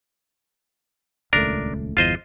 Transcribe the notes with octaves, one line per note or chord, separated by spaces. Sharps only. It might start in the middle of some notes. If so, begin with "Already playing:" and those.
D#1 C#2 A3 D4 A#4
G1 E2 F4 C5 D#5